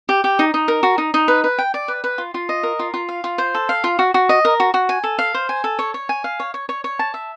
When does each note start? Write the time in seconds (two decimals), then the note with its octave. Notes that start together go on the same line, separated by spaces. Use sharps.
0.09 G4
0.24 G4
0.39 D#4
0.54 D#4
0.68 A#4
0.83 F#4
0.98 D#4
1.14 D#4
1.28 B4
1.44 B4
1.58 G5
1.74 D5
1.88 B4
2.04 B4
2.18 F4
2.34 F4
2.49 D#5
2.63 A#4
2.79 F4
2.94 F4
3.09 F5
3.24 F4
3.38 C5
3.54 A4
3.69 F5
3.84 F4
3.99 F#4
4.14 F#4
4.29 D#5
4.45 A#4
4.60 F#4
4.74 F#4
4.89 G#5
5.04 A4
5.19 F5
5.34 C5
5.49 G#5
5.64 A4
5.79 C#5
5.94 C#5
6.09 G#5
6.24 F5
6.40 C#5
6.54 C#5
6.69 C#5
6.84 C#5
6.99 A5
7.14 E5